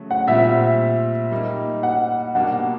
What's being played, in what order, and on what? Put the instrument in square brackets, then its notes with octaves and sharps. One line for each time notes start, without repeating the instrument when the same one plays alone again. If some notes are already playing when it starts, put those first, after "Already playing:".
Already playing: [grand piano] C#3 F#3 A3 F#4
[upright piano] F#5
[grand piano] A#2 G3 C4 [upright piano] E5
[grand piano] G3 A#3 D#4
[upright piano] F#5
[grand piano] B2 G3 A#3 D4 [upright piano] F#5